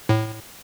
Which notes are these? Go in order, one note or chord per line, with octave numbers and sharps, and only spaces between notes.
A2